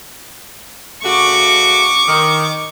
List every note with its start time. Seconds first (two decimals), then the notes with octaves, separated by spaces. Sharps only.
1.03 C#3 A3 F#4 C#6 D6
2.08 D#3